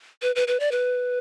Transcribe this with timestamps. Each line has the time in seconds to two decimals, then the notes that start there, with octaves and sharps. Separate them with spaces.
0.22 B4
0.36 B4
0.48 B4
0.60 D5
0.72 B4